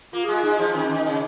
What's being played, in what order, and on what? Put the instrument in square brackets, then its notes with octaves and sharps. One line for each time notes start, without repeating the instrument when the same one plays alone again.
[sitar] A#3 [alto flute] F4
[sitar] G#3 [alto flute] G#4
[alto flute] F4
[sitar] G#3 [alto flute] D#4
[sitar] F3
[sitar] D#3 [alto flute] C#4
[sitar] D#3 [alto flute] D#4
[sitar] C#3